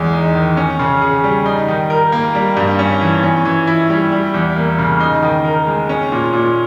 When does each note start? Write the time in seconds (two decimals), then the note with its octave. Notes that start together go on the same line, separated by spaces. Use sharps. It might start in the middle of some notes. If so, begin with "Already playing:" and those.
Already playing: E2 G#3
0.13 D#4
0.35 D#3
0.57 C#4
0.79 C#3
1.02 G#4
1.24 G3
1.46 D#4
1.68 D#3
1.90 A#4
2.12 A#3
2.35 G3
2.57 G2
2.79 C#4
3.01 E3
3.23 C#4
3.45 E3
3.67 E4
3.90 G3
4.12 G3
4.34 E2
4.56 A#3
4.78 C#3
5.00 D#4
5.23 D#3
5.45 A#4
5.67 G#3
5.89 C#4
6.12 A#2
6.33 A#2